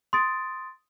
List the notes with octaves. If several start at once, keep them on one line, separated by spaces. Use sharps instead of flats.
C6 D#6 A6 D7